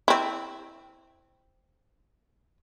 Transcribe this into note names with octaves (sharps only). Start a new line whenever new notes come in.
C4 E4